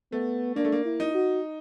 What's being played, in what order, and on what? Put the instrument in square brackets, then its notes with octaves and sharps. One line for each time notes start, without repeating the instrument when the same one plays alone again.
[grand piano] A3 [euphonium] B3
[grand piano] A#3 [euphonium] D4
[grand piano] A3
A#3
[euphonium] E4
[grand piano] D#4
[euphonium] F#4